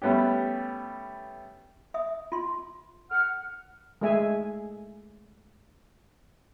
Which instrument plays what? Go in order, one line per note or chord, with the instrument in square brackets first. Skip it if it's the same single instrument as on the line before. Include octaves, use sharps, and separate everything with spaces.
[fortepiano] G3 A3 B3 C#4 G4
[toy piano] E5 D#6
F4 C6
[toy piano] A4 [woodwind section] F#5 F6
[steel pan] G#3 A3 G#4 E5 G#5